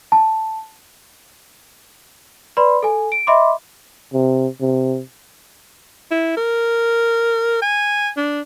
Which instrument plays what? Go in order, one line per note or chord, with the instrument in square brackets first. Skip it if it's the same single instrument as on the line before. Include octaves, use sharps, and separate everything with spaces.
[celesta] A5
B4 D5 B5 C6
A4 G#5
D7
D#5 E5 B5 C6 D6
[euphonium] C3
C3
[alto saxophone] E4
A#4
G#5
D4